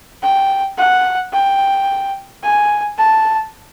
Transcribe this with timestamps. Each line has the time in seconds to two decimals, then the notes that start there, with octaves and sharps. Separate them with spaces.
0.23 G5
0.78 F#5
1.33 G5
2.43 G#5
2.98 A5